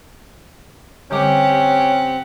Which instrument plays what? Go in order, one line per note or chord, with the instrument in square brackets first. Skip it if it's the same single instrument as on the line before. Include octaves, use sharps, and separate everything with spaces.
[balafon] D3 G3 D6 [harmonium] C4 [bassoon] C#4 [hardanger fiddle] G4 F#5